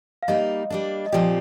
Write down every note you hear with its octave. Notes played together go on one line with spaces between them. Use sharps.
F5
G3 A#3 D#4 D#5
G3 A#3 D4
D#5
A#2 F3 C4 G4 D5